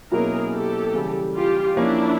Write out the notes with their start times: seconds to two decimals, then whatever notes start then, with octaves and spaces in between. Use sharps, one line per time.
0.11 B2 F#3 A#3 C#4 E4 G#4 A#4
0.53 G4 A4
0.94 C#3 E3 G3
1.35 F4 G4
1.77 F3 A#3 C#4 D4 E4